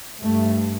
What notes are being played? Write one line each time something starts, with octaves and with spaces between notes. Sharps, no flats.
G2 A3